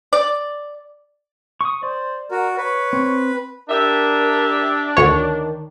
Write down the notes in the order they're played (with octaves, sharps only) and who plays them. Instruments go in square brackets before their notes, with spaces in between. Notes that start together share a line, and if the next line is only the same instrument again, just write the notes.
[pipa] D5
[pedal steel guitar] C#6 D#6
[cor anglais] C5 [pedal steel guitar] D5
[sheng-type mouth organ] F#4 [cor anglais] A#4
[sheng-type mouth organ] B4 [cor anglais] C#5
[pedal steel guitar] C4
[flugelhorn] D4 [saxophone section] G4 D5 E5 [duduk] A#4
[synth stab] D2 C#5 [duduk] D#3